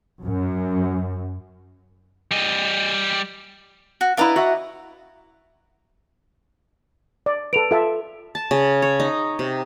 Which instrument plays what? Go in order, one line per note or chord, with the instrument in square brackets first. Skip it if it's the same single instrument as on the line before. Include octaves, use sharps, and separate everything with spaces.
[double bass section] F#2
[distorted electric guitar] G3 D#5
[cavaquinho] F#4
[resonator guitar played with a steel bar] E4 B4 F5 [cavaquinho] D5 D#5 A#5
[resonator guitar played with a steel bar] F#4 E5 F#5
[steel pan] D5
[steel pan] A4 B4 [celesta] D7 F7
[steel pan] F4 E5 A5 [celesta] A4
[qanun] A5
C#3
C#5
D#4
C3